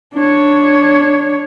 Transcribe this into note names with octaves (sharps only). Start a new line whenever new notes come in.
D4 C#5